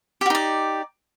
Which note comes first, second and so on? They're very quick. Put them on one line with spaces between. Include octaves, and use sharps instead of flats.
G4 F#4 D#4 D5